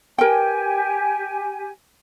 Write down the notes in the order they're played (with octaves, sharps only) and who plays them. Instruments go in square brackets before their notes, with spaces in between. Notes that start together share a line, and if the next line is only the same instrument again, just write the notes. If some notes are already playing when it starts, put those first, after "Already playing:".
[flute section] G4 G#5 [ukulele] A#4 B4 G5